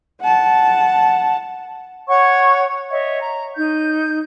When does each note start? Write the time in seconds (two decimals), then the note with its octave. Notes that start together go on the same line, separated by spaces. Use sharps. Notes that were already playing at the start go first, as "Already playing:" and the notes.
0.21 F#5 A5
2.08 C#5 F#5 C#6 G#6
2.91 C#5 D#5 E5
3.19 A#5
3.56 D#4 G6